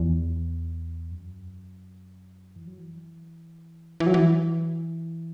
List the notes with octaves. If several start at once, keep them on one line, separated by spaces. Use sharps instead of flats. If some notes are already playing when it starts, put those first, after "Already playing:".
Already playing: E2
F#2
E3
F#3
E3
E3
F#3
E3